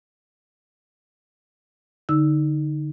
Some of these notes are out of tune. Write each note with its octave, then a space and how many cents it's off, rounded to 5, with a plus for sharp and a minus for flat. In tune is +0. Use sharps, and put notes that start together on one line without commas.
D3 +0 D#4 +0 E6 +0